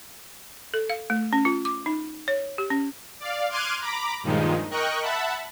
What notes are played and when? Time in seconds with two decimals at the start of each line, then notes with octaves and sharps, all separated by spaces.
0.74 A4
0.90 F5
1.10 A3
1.33 C#4
1.45 F4
1.65 D6
1.86 D#4
2.28 C#5
2.58 G4
2.70 C#4
3.20 D5 F5
3.49 C6 D6 F6 F#6 G#6 D#7
3.80 A#5 B5 D6
4.23 G2 A#2 D#3 F3 G#3 D#4
4.71 A#4 D#5 G5 C#6 F#6
5.01 E5 F#5 A5 B5